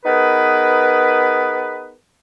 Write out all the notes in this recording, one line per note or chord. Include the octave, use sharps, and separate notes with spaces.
B3 D#4 G#4 A#4 B4